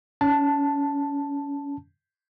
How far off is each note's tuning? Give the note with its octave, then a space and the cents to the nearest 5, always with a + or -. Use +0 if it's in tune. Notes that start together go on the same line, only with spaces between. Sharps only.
C#4 +25 A5 +0